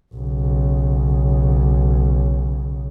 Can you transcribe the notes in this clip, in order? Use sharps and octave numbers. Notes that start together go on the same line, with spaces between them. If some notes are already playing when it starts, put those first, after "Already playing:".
B1 C#3